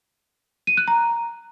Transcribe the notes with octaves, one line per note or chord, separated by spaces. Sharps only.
D#7
F#6
A#5